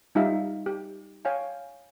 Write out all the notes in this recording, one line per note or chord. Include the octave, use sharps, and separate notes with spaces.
G3 D#4 F4 G4 E5 F5
G4
C#5 F5 G5 G#5